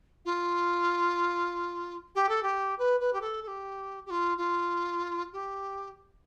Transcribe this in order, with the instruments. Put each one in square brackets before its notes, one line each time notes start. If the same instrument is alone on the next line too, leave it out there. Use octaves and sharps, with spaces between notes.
[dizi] F4
G4
A4
G4
B4
B4
G4
A4
A4
G4
G4
F4
F4
G4